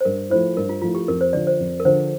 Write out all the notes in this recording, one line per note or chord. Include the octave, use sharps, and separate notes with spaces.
C5
G2 A#4
F3 A3 E4 C5
G2 A#4
F4
F3 A3 E4 F4
G4
F2 A#4
C5
D3 F3 D5
C5
F2
A#4
D3 F3 C5